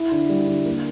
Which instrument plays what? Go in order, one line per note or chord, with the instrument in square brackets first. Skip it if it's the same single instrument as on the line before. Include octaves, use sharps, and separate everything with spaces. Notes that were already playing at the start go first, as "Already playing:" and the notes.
Already playing: [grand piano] E4
D3
G3
D3
A#3